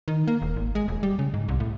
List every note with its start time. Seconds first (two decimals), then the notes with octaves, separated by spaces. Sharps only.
0.08 D#3
0.27 A#3
0.42 D#1
0.56 G#1
0.75 G#3
0.88 D#1
1.03 G3
1.19 C#3
1.34 G#2
1.48 C2
1.60 A2